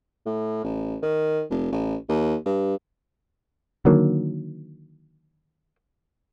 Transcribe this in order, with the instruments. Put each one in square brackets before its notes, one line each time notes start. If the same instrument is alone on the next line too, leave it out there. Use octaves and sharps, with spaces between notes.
[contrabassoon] A2
A1
D#3
F1
A1
D#2
G2
[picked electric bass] D3 D#3 F#3 A#3